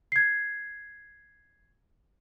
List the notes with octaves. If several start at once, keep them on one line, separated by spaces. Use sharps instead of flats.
G#6 C7